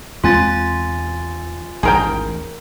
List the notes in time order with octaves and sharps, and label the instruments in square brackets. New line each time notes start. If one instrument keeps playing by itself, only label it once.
[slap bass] E2 G#3 C4 [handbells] F4 G#5 A6
[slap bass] A1 D#2 G#2 [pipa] G#4 A#4 G5